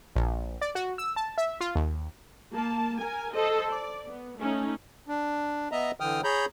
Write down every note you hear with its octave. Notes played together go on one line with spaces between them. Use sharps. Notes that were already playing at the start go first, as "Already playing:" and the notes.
A#1
D5
F#4
E6
A5
E5
F4
D#2
A#3 A5
A#4 G#5
A4 C5 D#5
D5
B3
A3 C#4 D#4
D4
B3 D#5 E5 A#5
D3 E3 G5 D#6 F6
G#4 C#5 A#5 B5 G6